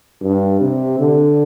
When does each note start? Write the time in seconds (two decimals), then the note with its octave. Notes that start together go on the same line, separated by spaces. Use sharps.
0.22 G2
0.61 C3
1.00 D3